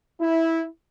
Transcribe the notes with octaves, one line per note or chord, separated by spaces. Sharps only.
E4